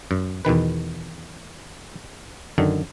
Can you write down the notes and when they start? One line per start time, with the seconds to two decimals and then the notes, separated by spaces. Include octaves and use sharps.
0.11 F#2
0.45 E2 B2 D#3 B4
2.58 F#2 D3 D#3